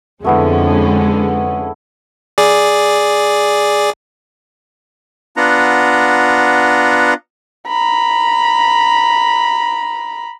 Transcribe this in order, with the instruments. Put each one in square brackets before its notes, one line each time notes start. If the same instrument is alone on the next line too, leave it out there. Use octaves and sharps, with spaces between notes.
[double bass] F2 [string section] D3 G#3 C#4 [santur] A3 B3 E4
[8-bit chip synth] G#4 D5
[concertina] B3 D4 F4 F#5 A#5
[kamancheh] A#5 B5